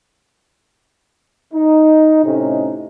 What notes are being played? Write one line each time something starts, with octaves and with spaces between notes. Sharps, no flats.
D#4
A2 C3 A3 C#4 D#4